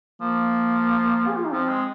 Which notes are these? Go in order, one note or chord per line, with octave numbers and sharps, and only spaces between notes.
F3 A#3
G#4
F4
D#4
F3 C4
G#3